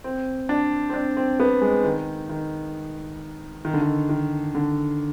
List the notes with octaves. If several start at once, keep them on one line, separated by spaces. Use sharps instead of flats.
C4
D4
C4
D4
C4
B3
G#3
D#3
D#3
D#3
D3
D#3
D#3
D3